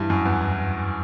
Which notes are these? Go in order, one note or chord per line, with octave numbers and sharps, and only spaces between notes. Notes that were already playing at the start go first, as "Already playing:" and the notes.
Already playing: G2 E3 G3
F#2
E2